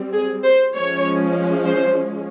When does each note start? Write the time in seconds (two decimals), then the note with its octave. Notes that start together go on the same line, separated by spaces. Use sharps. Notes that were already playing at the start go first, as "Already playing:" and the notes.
Already playing: G3 C4
0.13 G#4
0.43 C5
0.74 F3 G#3 C#4 C#5
1.66 C5